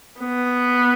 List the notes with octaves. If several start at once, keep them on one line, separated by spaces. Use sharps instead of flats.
B3